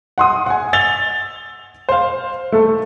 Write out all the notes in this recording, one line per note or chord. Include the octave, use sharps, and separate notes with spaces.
F#5 C6 D#6
F#5 G#5
E6 A6 F7 G7
C5 F5
A3 A4